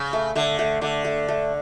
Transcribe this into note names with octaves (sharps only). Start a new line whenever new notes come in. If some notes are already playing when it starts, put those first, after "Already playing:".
Already playing: C#3
A3
D3 A3
A3
D3 A3
A3
A3